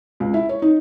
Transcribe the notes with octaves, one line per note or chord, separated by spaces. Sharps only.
C#2
E4
C#5
D#4